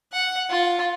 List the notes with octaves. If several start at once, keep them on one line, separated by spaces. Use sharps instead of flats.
F#5
F4